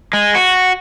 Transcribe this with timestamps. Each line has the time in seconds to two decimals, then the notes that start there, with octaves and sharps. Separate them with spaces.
0.13 G#3
0.35 F#4